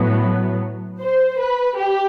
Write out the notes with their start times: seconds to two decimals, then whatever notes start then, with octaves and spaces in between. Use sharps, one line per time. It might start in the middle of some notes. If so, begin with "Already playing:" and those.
Already playing: A2 F#3 B3
1.01 C5
1.39 B4
1.76 G4